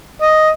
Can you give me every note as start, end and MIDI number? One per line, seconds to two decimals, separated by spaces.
0.22 0.49 75